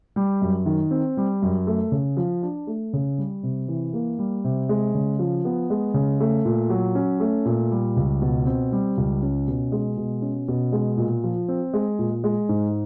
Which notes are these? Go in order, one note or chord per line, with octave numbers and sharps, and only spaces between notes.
G3
F#2
D#3
C4
G3
F#2
A3
C#3
F3
D4
A3
C#3
G3
C3
E3
A#3
G3
C3
G#3
C#3
F3
B3
G#3
C#3
A3
A#2
F#3
C#4
A3
A#2
G3
C#2
B2
C4
G3
C#2
C#4
B2
G#3
B2
C#4
B2
G#3
A#2
F3
C4
G#3
A#2
G#3
G#2